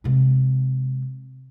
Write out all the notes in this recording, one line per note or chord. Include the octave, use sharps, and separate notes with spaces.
C3 G#3